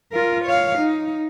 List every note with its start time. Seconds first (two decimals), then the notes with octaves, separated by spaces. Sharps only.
0.12 F4 A#4
0.45 C#5 F5
0.78 D#4